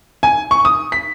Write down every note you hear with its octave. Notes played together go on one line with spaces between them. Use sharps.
G#5
C#6
D#6
B6